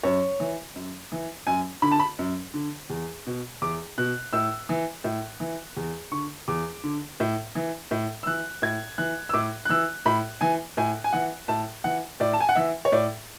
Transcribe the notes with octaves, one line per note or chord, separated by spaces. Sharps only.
F#2 C#5
E3
F#2
E3
F#2 G#5
D3 B5
A5
B5
F#2
D3
E2
B2
E2 D6
B2 F#6
A2 E6
E3
A2
E3
E2
D3 C#6
E2 D6
D3
A2
E3
A2
E6
E3 F#6
A2 G#6
E3 F#6
E6
A2 D6
F#6
E3 E6
A2 B5
E3 G#5
A2 G#5
G#5
E3 F#5
A2 A5
E3 F#5
A2 D5
A5
G#5
F#5
E3 E5
C#5
A2 D5